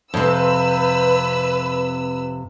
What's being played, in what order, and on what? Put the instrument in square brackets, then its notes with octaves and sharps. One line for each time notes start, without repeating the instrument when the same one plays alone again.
[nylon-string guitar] F2 C3 [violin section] B4 E6